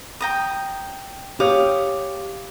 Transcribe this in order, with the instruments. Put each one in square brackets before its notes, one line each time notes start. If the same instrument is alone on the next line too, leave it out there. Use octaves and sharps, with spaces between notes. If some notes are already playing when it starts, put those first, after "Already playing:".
[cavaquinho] G5 A#5 D#6
[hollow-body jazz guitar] G4 C#5 [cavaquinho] F5 D6 D#6